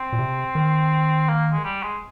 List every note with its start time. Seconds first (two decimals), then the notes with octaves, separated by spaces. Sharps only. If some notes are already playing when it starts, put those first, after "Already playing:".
Already playing: C4
0.13 A#2
0.19 C3
0.55 D#3
1.28 A#3
1.53 G#3
1.64 G3
1.83 G#3